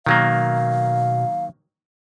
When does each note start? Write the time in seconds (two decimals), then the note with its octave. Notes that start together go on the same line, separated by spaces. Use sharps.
0.06 B2 D#3 F#3 A#3 F5